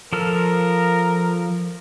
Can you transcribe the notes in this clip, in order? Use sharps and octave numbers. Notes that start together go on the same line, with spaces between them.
F3 A4 A#4 F6